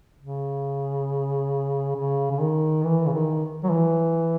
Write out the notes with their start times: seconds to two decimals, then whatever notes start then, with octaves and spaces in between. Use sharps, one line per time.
0.19 C#3
1.96 C#3
2.31 C#3
2.40 D#3
2.84 E3
3.06 C#3
3.13 D#3
3.64 F#3
3.71 E3